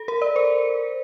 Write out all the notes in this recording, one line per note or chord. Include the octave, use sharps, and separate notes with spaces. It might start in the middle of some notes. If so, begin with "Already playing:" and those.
Already playing: A4
A#4
D5
C5